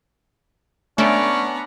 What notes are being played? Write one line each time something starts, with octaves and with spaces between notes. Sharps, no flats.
A3 B3 C#4 D4 A#5 D6